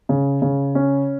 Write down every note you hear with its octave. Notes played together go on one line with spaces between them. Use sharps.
C#3
C#3
C#4